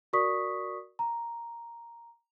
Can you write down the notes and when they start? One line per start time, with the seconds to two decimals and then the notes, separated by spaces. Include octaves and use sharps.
0.13 F#4 A#4 D5 C#6 D#6 B6
0.99 A#5